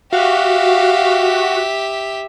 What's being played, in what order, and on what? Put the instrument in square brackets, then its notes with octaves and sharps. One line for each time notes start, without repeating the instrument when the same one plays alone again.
[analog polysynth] F#4 [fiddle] G4 E5 [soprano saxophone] F5